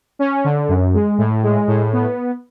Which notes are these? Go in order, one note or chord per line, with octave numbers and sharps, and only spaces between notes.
C#4
D3
F#2
G#3
A2
G#3
A2
B3